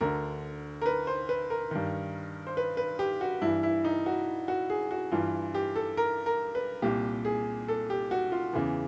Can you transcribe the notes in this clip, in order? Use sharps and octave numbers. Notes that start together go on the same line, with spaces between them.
D2 D3 A#4
A#4
B4
C5
B4
A#4
G2 D#3
C5
B4
B4
G4
F#4
G2 E3 E4
E4
D#4
F#4
F#4
G#4
F#4
G2 E3 F4
G4
A4
A#4
A#4
B4
C2 A#2 G4
G#4
A4
G4
F#4
F4
E2 C#3 E3